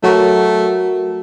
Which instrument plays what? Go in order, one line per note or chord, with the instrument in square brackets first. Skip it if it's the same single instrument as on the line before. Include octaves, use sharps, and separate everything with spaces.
[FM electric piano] F#3 F#4 A#4 [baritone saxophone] A3